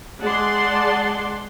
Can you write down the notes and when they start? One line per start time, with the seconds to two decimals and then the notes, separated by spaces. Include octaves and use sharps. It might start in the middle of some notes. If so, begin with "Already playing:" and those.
0.21 G#3 D5 F#5 A5 C6